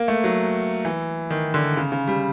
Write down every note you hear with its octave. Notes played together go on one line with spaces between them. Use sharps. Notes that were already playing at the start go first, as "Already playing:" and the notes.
Already playing: A#3
A3
F#3
E3
D#3
D3
C#3
C#3
G3